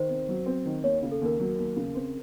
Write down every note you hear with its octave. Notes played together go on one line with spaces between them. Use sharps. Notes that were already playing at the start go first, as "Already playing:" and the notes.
Already playing: D#3 C5
C3
F#3
C4
D#3
D#2 C#5
C#3
A4
D#2 A#4
F#3
D#2
C#3
C4